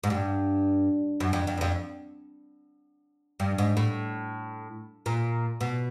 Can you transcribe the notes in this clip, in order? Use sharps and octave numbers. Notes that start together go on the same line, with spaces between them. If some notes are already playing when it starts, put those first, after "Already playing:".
G#2
G2
F#2
F2
F2
E2
F2
G2
G#2
A2
A#2
B2